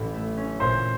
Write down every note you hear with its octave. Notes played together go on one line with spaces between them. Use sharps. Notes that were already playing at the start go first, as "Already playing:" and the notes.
Already playing: A1 A2 C#4
A3
C#4
A#2 C5 C6